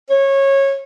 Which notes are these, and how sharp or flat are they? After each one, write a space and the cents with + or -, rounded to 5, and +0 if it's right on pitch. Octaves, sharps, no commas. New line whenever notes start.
C#5 -20